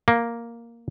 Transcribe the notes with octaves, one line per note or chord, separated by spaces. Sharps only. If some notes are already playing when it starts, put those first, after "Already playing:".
A#3